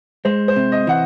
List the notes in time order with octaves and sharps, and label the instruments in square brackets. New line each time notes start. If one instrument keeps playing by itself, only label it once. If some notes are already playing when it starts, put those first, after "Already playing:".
[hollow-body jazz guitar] G#3 [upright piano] C5
[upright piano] C5
[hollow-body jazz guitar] C3
[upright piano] D#5
[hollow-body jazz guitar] E3 [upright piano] F#5